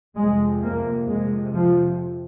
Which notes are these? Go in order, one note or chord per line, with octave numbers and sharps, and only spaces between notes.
F2 C3 G#3
A#3
F2 C3 G#3
F3